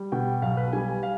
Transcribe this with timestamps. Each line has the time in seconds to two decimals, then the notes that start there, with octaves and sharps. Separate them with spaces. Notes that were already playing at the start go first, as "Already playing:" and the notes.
Already playing: G3
0.12 B2 G5
0.42 B1 F5
0.57 B4
0.73 G3 G#5
0.88 G#5
1.03 F5